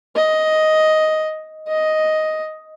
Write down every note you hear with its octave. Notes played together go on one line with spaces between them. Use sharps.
D#5
D#5